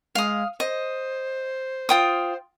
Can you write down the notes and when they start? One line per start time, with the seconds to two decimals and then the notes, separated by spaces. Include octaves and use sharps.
0.15 G#3 F5 D#6
0.60 C5 D#5
1.89 F4 G5 D#6